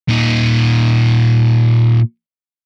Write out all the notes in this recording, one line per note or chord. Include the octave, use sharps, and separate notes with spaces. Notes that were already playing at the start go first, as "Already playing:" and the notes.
A#2 D#4